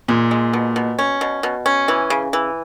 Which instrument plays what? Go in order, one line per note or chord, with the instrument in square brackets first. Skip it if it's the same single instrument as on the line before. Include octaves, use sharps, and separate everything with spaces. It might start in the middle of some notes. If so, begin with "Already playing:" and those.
[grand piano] A#2 [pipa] G#3
[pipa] G#3
B2
B2
C#4
B2
B2
C#4
E3
C#3
E3